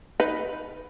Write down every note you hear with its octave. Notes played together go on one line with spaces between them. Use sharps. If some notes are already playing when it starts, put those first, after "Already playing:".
D#4 B4